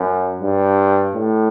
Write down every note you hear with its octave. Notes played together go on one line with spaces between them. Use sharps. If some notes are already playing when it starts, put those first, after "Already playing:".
Already playing: F#2
G2
A2